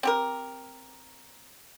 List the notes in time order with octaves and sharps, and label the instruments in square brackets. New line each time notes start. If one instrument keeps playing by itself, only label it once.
[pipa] C4 G4 A#4